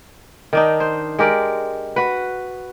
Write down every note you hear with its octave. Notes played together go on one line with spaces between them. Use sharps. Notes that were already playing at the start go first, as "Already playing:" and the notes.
D#3 D4 D#4
C5
G#3 G4 A#4 D5
F#4 B4